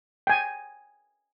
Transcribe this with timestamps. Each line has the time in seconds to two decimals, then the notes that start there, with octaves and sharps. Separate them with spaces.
0.27 G5 G#5